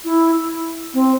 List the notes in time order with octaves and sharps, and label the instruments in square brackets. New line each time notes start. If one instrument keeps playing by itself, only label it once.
[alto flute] E4
C4